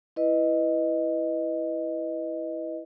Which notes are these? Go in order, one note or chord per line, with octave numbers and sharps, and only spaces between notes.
E4 B4 D#5